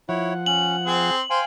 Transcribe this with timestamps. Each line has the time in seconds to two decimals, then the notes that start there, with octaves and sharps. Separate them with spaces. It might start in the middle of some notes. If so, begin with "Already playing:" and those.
0.09 F3 E4 C#5 F#5
0.46 C#4 F#7
0.87 C4 G#4
1.30 C5 F5 G5 G#5